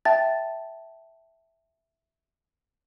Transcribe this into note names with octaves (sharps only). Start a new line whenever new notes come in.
E5 G5 A5 A6